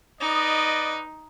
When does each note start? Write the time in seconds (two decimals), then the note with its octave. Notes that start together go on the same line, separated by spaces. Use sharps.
0.21 D#4 B4 D5 D#5